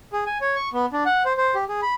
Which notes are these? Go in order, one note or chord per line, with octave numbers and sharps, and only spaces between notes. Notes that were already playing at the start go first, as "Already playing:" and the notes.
G#4
G#5
C#5
C#6
B3
D4
F#5
C5
C5
G4
G#4
B5